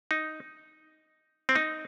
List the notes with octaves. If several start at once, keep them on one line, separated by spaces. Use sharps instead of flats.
D#4
C4
D#4